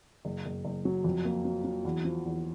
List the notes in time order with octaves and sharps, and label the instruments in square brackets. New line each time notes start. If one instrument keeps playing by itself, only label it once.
[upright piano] F#1
F#1
F#1
F#3
F2
A#3
F#3
F#3
E2
F3
E2